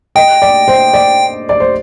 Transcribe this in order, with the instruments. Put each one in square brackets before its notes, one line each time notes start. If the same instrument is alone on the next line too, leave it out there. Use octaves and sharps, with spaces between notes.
[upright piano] D#5 [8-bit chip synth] G5
[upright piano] D5
C5
D5
D5
C5